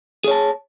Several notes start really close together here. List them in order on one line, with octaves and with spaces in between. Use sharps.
G#4 C#5 A5